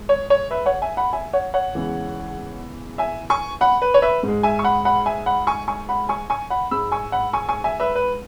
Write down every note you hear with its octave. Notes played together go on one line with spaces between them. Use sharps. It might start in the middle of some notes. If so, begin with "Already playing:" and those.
Already playing: G#3
C#5
C#5
B4 E5
C#5 F#5
E5 G#5
F#5 B5
E5 G#5
C#5 F#5
C#5 F#5
E2 C#3 E3 G#3
E5 G#5
G#5 C#6
F#5 B5
B4
C#5
B4 E5
G#2 G#3
E5 G#5
C#6
F#5 B5
F#5 B5
E5 G#5
F#5 B5
G#5 C#6
G#5 C#6
F#5 B5
G#5 C#6
G#5 C#6
F#5 B5
G#2 G#3 B5 E6
G#5 C#6
F#5 B5
G#5 C#6
G#5 C#6
E5 G#5
B4 E5
B4